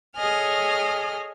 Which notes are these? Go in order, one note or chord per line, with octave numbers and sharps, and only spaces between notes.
G#4 A4 C#5 D#5 G#5 F6